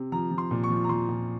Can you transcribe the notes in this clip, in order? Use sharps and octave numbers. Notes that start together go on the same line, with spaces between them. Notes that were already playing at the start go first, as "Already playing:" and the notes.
Already playing: C3
F3 A#5
F3
C6
A#2
C#6
F3
A#5
F3 C6
A#2